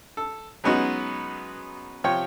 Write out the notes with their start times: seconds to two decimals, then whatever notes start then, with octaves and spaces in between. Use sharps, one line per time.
0.17 A4
0.64 F#3 G#3 B3 C#4 D#4 F#4
2.04 C3 F3 C#5 G5